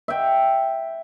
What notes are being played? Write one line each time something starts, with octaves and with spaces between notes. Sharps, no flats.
E5 G5